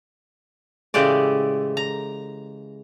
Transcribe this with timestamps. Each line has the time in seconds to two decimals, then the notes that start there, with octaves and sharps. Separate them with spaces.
0.94 A2 C#3 E3 G#3 G4 D5
1.77 A#5